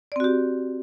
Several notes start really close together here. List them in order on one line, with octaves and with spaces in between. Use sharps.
D5 C4 F#4 G4